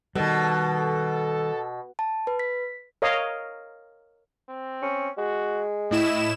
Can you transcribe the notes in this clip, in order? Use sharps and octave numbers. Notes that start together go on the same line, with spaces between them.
B2 D#3 G3 A4
A5
B4
B6
A#4 C#5 D#5 F5
C4
C#4
G#3 F#4
A2 E4 D#5 E7